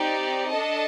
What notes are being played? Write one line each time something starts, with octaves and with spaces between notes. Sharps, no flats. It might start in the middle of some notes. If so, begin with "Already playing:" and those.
Already playing: C4 D#4 G4 D5
D4 A4 D#5 A5